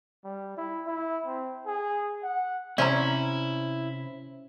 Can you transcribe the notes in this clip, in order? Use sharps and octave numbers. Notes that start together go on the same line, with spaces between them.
G3
E4
E4
C4
G#4
F#5
C3 C#4 E4 C5 D5 E5 A#5